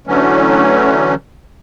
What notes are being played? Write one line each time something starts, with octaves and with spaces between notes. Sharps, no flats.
D3 E3 F#3 A3 C#4